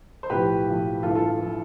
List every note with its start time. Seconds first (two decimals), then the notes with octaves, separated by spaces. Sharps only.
0.23 C5
0.30 B1 A2 F3 G4 B4
0.66 B1 A2 F3
1.03 A1 G2 E3 F4 A4
1.15 F4 A4
1.42 E3